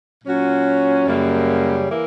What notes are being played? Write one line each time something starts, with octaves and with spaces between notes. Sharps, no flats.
A#2 F#3 C#4 F#4
F#2 C#3 G3 A#3
E3 A#3